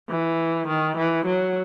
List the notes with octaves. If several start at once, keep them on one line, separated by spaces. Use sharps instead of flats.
E3
D#3
E3
F#3